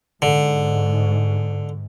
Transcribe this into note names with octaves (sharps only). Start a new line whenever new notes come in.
G#2 D3